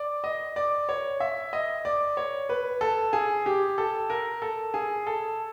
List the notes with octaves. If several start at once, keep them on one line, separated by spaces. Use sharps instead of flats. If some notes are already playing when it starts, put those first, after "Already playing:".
Already playing: D5
D#5
D5
C#5
E5
D#5
D5
C#5
B4
A4
G#4
G4
A4
A#4
A4
G#4
A4